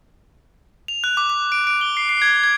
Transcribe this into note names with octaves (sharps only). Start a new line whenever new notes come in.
F7
F#6
D6
D6
D7
D7
G7
C7
C7
G#6
G#6